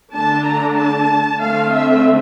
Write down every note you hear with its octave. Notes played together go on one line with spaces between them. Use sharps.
D3 A3 D4 A5
A#5
A5
D3 A3 C4 F5
E5